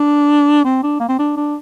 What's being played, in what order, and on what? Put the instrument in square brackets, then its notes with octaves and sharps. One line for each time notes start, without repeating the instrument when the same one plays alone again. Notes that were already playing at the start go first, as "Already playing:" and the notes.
Already playing: [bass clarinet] D4
C4
D4
A#3
C4
D4
D4